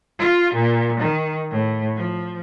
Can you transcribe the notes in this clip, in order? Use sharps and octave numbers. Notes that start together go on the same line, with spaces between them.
F4
A#2
D#3
A2
F3